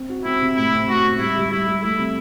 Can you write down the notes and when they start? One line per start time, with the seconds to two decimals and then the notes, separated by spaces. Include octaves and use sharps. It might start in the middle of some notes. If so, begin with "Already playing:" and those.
Already playing: C4
0.09 F#4
0.24 C4 E4
0.41 C3
0.56 A2 E4
0.72 C4
0.88 A2 F#4
1.04 C4
1.19 G3 E4
1.36 G3
1.51 G3 E4
1.67 G3
1.82 A3 E4
1.98 C3